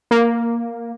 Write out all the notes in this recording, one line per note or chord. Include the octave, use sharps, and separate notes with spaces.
A#3